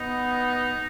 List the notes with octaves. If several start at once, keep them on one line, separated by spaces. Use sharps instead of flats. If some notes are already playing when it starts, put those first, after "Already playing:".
Already playing: B3 D#4